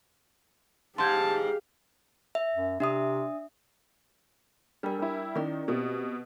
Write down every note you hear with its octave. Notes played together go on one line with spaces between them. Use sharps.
G#2 G4 F5 A5 C6 G6 G#6
E5
F#2
C3 D4 E5 D#6
G3 D4 A#4
G3 E4
D#3 C#4 E4 D5
B2 A#3 C4 G4